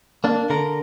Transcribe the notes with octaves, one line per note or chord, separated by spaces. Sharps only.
A#3 D4
D3 A#4